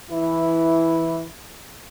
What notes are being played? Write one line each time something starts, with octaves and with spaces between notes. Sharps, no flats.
E3 E4